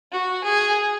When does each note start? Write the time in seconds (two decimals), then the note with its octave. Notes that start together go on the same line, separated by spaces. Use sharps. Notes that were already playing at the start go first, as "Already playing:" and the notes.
0.12 F#4
0.44 G#4